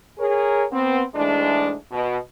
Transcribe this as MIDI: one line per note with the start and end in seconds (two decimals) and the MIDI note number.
0.18 0.63 68
0.18 0.63 70
0.18 0.63 73
0.72 1.02 59
0.72 1.02 60
1.14 1.73 44
1.14 1.73 52
1.14 1.73 56
1.14 1.73 57
1.14 1.73 62
1.91 2.17 47